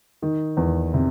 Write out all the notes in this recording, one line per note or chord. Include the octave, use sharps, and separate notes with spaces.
D#3
E2
C3